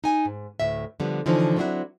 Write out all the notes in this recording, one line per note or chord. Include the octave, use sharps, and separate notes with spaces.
D#4 G#5
G#2
D2 A2 E5
D3 F3 G3 B3
D3 E3 F3 C#4 D#4 C5
F#3 B3 C4 D4 E4 F#4